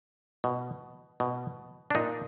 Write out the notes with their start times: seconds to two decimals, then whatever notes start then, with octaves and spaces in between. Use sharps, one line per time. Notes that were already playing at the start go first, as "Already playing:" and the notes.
0.44 B2
1.20 B2
1.90 D4
1.95 A#2 D#4